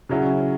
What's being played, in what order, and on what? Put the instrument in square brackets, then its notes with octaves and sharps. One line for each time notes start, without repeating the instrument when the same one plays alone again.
[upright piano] C#3 F#3 C#4 E4